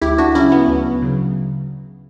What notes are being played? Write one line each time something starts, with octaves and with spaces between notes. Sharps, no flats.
D2 E4 G4
D4 F#4
C#3 F#3 C#4 E4
B3
D2
C#3 F#3